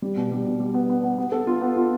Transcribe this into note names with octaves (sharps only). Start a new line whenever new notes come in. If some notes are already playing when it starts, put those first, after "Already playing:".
G3
B2
G3
B2
G3
B3
B3
B3
B3
A4
F4
B3
F4